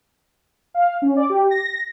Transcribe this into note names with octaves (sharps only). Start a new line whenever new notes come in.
F5
C#4
D5
G4
A#6